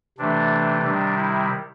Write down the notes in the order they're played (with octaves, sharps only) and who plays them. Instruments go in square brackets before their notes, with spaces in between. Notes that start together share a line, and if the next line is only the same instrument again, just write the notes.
[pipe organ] C3 E3 A3 D4
C3 D#3 G3 D4
E4